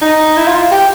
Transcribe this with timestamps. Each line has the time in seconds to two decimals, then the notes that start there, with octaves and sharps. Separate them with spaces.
0.02 D#4
0.37 E4
0.48 F4
0.71 G4